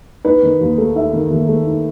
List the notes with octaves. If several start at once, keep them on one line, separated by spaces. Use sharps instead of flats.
D#4 B4
D#3
D#2
A3
D#4 E5
D#3
D#2
A3
D#4